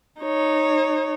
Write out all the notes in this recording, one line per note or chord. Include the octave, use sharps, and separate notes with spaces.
D#4 C#5